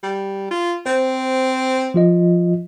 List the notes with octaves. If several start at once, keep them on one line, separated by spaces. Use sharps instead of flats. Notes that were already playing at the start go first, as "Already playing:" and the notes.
G3
F4
C4 C5
F3 F4 D#5